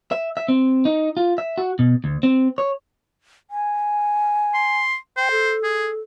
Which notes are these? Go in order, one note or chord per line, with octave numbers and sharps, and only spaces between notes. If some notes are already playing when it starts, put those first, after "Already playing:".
E5
E5
C4
D#4
F4
E5
F#4
B2
D2
C4
C#5
G#5
C6
C5 G5
A4
G#4